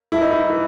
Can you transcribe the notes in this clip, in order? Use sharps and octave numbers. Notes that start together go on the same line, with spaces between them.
G2 E3 E4
D#4
E4
E3